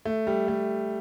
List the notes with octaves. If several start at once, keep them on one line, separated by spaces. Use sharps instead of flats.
A3
G3
A3